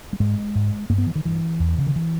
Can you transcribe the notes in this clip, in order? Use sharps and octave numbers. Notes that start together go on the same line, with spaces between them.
G3
G#2 G#3
G#2
G2 A#3
B3
E3
D#3
G2 E3
E2
C#3
D#3
E3